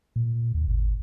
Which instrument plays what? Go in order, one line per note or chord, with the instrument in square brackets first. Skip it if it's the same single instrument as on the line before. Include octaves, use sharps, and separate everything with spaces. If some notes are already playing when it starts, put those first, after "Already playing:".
[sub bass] A#2
D#2
G#1